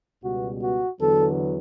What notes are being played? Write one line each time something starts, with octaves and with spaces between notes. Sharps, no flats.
C#2 B2 G3 B3 F#4
F#4
E2 D3 F#3 B3 A4